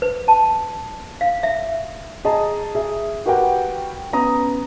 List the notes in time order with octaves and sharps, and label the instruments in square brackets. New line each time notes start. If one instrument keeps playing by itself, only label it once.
[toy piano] B4
A5
F5
E5
[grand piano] G#4 D#5 A5 A#5
G#4 E5
F#4 G4 A#4 B4 F#5 G5
B3 C#4 A#5 D#6